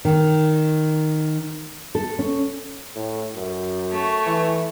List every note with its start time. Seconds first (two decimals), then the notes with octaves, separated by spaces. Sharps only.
0.05 D#3
1.95 A4
2.19 C#4
2.95 A2
3.35 F#2
3.91 A3 C#5
4.27 E3